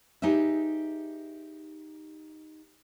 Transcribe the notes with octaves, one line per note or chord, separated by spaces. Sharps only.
D#4 G4 G#4 B4 E5